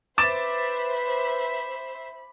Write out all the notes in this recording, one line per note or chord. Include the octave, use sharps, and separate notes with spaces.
B4 C5 E5 B5 D6 A6 E7